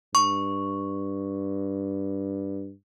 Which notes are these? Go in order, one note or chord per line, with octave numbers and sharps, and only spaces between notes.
G2 C#6